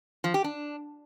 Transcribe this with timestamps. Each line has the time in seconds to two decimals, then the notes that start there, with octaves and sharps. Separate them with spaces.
0.24 F3
0.34 G4
0.44 D4